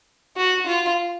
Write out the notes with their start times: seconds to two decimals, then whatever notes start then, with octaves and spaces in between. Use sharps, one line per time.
0.37 F#4
0.67 F4